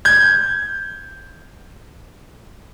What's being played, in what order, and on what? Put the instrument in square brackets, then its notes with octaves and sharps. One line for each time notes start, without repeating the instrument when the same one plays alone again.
[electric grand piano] G6 G#6